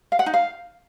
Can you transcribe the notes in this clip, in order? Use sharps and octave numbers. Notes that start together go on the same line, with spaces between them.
F5
F#5
D#4
F5